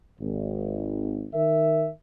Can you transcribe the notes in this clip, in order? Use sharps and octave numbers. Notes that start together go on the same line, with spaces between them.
G#1
D#3 A#4 E5